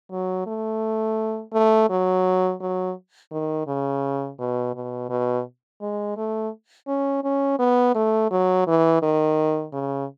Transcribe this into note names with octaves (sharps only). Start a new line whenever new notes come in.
F#3
A3
A3
F#3
F#3
D#3
C#3
B2
B2
B2
G#3
A3
C#4
C#4
B3
A3
F#3
E3
D#3
C#3